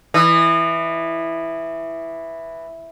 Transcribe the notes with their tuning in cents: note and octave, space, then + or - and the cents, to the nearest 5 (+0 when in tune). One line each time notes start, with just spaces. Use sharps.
E3 +0 D#5 -30